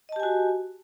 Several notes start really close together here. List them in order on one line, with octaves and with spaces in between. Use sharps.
D#5 A5 G4 G#5 F#4